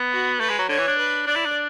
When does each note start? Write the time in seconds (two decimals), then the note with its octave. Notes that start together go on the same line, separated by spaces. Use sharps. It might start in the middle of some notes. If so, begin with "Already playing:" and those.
Already playing: B3
0.11 F#4
0.39 A3 B4
0.50 G#3
0.59 F#3
0.69 D3 C#5
0.79 E3
0.88 D4
0.98 B4
1.27 D4 D5
1.36 E4
1.46 D4